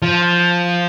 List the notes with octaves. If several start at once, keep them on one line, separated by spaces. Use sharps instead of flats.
F3